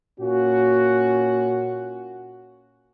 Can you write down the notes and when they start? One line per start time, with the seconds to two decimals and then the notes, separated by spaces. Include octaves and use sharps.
0.20 A#2 A#3 C#4 F4 F#4